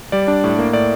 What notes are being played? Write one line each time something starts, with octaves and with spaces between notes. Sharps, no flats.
G3 D5
D4
A2
A#3
A2 D5